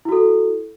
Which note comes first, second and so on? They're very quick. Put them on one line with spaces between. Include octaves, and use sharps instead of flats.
E4 F#4 A4